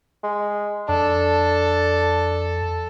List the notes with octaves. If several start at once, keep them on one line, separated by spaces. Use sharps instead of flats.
G#3
F2 D4 A4